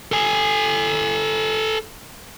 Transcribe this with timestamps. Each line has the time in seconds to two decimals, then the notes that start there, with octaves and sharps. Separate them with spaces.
0.12 A4 G#5